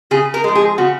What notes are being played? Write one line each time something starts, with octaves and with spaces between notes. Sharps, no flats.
C#3 G#4
A#4
F3 G#3
G#4
C#3 F#4